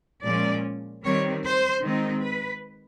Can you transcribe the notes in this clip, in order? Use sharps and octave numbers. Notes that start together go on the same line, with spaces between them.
A#2 F3 G#3 C#4 D5
D#3 G3 C4 C#5
C5
D#3 G#3 C4 D#4
B4